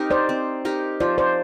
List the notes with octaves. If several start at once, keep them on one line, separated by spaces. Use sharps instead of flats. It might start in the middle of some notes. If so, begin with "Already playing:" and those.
Already playing: C4 D#4 G4 A#4
C5 D5
C4
D#4 G4 A#4
F3 C5 D5
C5 D5